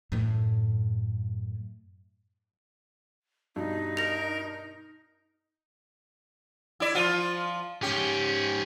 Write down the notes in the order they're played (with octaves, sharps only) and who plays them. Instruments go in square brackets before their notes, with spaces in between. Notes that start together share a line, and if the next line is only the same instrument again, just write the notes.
[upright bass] F#2 A2
[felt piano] G2 B2 [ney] D#4
[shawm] A#4 [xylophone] A#6 F7
[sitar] E4 D5
F3 F4
[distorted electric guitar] G#2 C#4 [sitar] G4